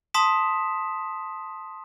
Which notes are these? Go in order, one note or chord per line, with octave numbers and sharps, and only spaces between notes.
A5 C6 D#6 B6 E7